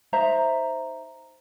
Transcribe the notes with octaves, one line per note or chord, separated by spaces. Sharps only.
D#4 C5 E5 A#5